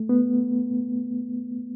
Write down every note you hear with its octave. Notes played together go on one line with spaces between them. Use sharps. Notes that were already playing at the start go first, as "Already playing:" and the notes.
Already playing: A3
B3